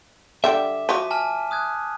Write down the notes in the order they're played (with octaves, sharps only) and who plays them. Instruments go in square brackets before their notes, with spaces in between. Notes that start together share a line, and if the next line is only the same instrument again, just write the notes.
[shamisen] D3 G3 G5 [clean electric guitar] E5 [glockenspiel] D6
[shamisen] F3 F#4 [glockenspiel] D6 B6 D#7
[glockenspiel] G#5 A5 F6
D#6 F#6 G#6